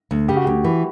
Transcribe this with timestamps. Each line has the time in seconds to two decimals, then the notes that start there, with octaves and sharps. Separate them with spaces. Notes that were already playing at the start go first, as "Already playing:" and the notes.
0.11 D2
0.28 C#3 G4
0.36 F#4
0.44 D2 G4
0.64 E3